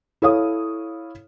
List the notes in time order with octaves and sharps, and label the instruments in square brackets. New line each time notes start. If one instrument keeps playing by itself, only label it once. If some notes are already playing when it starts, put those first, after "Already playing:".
[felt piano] E4 A4 C#5 F5 D#6